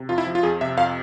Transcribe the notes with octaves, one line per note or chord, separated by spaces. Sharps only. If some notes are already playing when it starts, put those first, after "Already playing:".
Already playing: C3
F2 F4
E4
F3
F4
F2 G#4
C3 E5
F2 F5